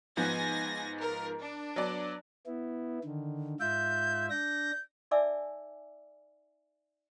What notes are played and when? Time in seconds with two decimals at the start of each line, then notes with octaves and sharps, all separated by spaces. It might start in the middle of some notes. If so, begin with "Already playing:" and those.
0.17 G#2 F3 B3 G#5 A#6
1.00 A#4
1.40 D4
1.76 F#3 B3 D5
2.46 B3 E4
3.05 D3 D#3
3.60 G#2 F4 E5 G6
4.30 D4 G6 A#6
5.11 D#4 D5 E5 G#5 D6 E6